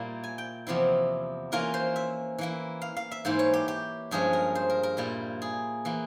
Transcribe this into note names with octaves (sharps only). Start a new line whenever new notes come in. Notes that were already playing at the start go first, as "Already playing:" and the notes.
Already playing: A#2 G3 A#3 E4
G#5
G5
E2 C3 F3 C4 E4
E3 A#3 C#4 F4 A#4
C5
E5
E3 A#3 E4
F5
F5
E5
G#2 E3 A#3 E4 C5
C#5
G4
G4
G2 F3 G#3 C#4 G#4
A#4
C5
A#4
A#4
A#2 G3 A#3 E4
G#4
E3 A#3 E4